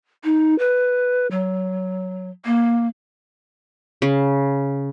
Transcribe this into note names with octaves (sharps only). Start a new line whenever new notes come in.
D#4
B4
F#3
A#3
C#3